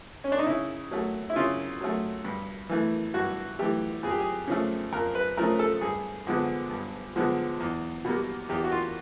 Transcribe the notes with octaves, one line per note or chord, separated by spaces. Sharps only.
C#4
D4
D#4
C#3 E4
F#3 A3
E4
C#3 F4
F#3 A3
G2
E3 A3
G2 F#4
E3 A3 G4
F2 G#4
G4
G#4
C#3 F3 A3
F2 A#4
B4
C#3 F3 A3 A#4
A4
G2 G#4
D3 F3 G#3 B3
G2
D3 F3 G#3 B3
E2
B2 G3 A#3
E2 G4
F#4
F4